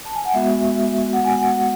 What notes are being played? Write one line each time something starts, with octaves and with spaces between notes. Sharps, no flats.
A5
G#5
F#5
G#3 B3 F#4 E5
G#3 B3 F#4 F#5
G#5
F#5